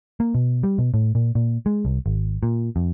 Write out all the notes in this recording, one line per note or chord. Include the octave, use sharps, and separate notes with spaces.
A#3
B2
G3
B2
A2
A#2
A#2
G#3
C2
G#1
A#2
F2